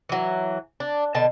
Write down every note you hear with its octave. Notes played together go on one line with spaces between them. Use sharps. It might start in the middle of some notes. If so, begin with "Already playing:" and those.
E3 F#3
D4
B2 D3 D#5 A5